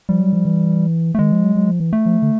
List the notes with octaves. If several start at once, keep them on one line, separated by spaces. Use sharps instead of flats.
F3 G3
F#3
F3
E3
A3
D#3 G#3
F3
F#3
F#3
F3
E3
A3
F3
D3